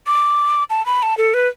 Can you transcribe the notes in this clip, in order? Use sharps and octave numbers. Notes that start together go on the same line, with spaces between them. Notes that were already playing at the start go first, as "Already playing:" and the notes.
D6
A5
B5
A5
A4
B4